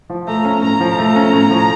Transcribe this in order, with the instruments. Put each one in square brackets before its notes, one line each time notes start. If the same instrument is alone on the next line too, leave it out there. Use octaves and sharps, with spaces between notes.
[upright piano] F3
[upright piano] A3 [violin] A#5
[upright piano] C#4
[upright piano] A2 [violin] A#5
[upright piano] F3
A3
C#4
A2
F3